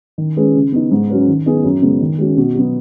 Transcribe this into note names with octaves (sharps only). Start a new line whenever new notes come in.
D#3
G#3 C#4 G#4 B4
C#3
B3 D#4
G#2
F#3 C#4 B4
D#3
B3 D#4 G#4 B4
F#2
C#3 G#3 B3
D#3
G#3 C#4 F#4
B2
F#3 B3